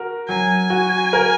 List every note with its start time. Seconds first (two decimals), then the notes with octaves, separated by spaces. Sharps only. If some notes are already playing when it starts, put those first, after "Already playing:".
Already playing: F#4 A#4
0.29 F#3 G#5
0.70 F#4
1.13 A#4